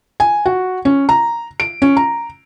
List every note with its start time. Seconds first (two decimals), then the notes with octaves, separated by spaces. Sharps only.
0.20 G#5
0.46 F#4
0.85 C#4
1.09 A#5
1.60 D7
1.82 C#4
1.97 A#5